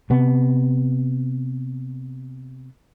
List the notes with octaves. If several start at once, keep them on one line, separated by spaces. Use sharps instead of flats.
C3 B3